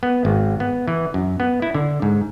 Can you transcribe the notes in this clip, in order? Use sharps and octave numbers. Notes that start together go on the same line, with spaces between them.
B3
G#1
B3
E3
F#2
B3
E4
D3
G#2